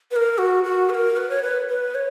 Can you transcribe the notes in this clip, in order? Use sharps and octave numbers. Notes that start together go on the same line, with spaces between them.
B4
A#4
F#4
F#4
B4
A#4
B4
C#5
B4
B4
C#5